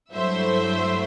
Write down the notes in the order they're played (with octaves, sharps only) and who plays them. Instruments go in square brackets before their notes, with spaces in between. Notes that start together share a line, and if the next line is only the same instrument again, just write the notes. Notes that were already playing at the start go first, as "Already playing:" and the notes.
[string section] G2 F#3 A3 E4 C5 E5